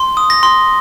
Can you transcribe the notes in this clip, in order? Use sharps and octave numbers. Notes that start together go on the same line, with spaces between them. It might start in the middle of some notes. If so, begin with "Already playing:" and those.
Already playing: C6
D#6
A#6
C6